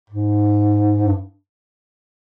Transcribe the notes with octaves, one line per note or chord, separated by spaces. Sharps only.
G#2
G2